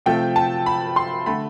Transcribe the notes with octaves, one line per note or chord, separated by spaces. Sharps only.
C3 F3 A3 G5
A5
B5
C6
D3 A3 B5